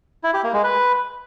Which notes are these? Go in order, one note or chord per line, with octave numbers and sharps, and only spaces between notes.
E4
G4
A#3
G#3
B4